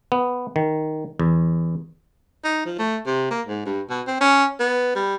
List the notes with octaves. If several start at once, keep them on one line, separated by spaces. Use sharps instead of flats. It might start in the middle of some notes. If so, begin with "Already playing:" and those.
B3
D#3
E2
D#4
F3
A3
C3
A#3
G#2
G2
B2
C4
C#4
B3
G3